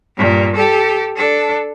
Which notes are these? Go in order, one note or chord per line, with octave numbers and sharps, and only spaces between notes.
G2 A#2
G4 A4
D4 A4